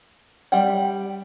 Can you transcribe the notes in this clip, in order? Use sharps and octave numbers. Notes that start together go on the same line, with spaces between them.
G3 E5 F#5 G5